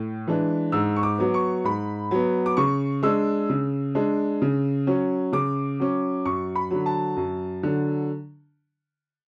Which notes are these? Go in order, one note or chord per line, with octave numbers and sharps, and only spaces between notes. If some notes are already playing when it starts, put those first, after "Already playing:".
Already playing: A2
E3 G#3 D4
G#2 E6
C#6
D6
F#3 B3
C#6
G#2 B5
F#3 B3
D6
C#3 C#6
G#3 D4 E6
C#3
G#3 D4
C#3
F#3 C#4
C#3 D6
F#3 C#4
F#2 C#6
B5
D3 F#3
A5
F#2
D3 F#3